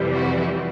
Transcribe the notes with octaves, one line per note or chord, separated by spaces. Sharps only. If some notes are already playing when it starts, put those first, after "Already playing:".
Already playing: F2 C3 E3 G3
E4 F#4